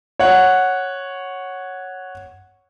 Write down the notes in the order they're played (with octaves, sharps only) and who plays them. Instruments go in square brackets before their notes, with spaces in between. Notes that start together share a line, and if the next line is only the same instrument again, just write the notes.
[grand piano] C#5 F#5